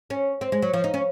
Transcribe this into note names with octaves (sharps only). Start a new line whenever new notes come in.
C#4
C4
G#3
F#3
F3
D#4
C#4